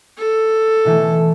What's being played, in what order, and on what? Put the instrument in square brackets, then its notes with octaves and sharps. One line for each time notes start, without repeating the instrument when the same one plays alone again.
[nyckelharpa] A4
[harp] B2 E3 A3